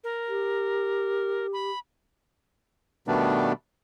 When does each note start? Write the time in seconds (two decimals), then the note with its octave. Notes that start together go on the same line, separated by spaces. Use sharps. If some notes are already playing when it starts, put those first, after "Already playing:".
0.04 A#4
0.28 G4
1.53 B5
3.08 B2 D#3 G3 A3 B3 D4